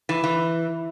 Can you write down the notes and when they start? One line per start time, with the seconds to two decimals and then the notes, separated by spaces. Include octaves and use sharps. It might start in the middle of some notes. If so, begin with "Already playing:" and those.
0.09 E3
0.24 E3